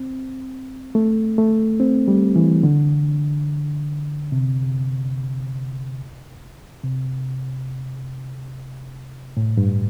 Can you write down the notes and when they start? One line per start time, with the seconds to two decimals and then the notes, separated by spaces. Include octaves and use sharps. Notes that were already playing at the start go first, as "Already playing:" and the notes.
Already playing: C4
0.95 A3
1.38 A3
1.80 C4
2.08 G3
2.36 E3
2.63 D3
4.32 C3
6.84 C3
9.37 A2
9.57 G2